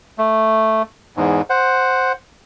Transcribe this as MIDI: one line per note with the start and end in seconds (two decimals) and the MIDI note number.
0.18 0.82 57
1.17 1.41 40
1.17 1.41 44
1.50 2.12 72
1.50 2.12 78